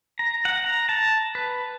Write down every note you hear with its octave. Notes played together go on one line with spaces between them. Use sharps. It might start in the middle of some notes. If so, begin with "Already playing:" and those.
A#5
F#5
A#5
A5
B4